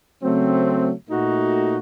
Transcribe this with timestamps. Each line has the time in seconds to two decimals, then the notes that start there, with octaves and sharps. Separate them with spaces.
0.22 C#3 F#3 A3 C4
1.08 A#2 A3 D#4 F#4